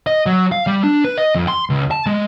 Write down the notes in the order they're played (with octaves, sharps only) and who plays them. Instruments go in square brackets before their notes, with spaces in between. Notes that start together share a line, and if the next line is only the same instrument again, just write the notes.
[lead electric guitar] D#5
F#3
F5
G3
D4
B4
D#5
F2
C6
C#2
A5
G#3